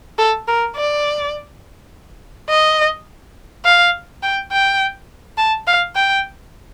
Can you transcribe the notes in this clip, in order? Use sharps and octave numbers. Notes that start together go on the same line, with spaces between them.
A4
A#4
D5
D#5
F5
G5
G5
A5
F5
G5